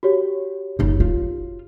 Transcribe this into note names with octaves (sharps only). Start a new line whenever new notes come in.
F#4 G4 C#5
F#1 D#4
F4